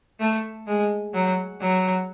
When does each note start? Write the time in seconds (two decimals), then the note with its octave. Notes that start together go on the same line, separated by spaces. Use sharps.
0.20 A3
0.67 G#3
1.14 F#3
1.61 F#3